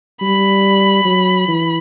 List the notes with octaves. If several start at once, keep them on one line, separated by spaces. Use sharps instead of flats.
G3 B5
F#3
E3